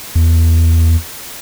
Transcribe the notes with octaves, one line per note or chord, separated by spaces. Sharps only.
E2